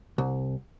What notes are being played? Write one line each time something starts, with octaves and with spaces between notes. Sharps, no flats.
C2